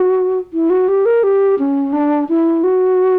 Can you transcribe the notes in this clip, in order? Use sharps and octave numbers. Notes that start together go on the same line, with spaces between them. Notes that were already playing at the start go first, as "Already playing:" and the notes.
Already playing: F#4
E4
F#4
G4
A#4
G4
C#4
D4
E4
F#4